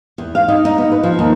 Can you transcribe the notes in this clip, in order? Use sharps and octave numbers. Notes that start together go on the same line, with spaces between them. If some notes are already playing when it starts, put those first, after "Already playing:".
E2
F5
D#4
D#4
B3
B4
F3
D#2